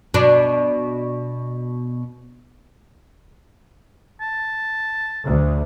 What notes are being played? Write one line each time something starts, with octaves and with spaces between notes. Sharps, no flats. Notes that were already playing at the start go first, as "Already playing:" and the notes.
B2 D4
A5
D2